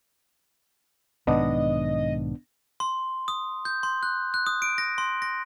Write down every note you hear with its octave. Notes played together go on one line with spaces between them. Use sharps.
B1 G#2 D#3 B3 D4 D#5
C6
D#6
G6
C6
F#6
F#6
D#6
D7
A#6
C6
A#6